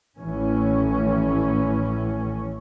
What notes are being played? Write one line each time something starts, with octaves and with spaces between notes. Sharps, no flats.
A1 A2 E3 C#4